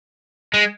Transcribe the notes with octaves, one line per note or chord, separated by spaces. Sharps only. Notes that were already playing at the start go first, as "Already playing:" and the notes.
G#3